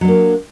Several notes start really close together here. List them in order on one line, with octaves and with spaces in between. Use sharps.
F#3 D4 A#3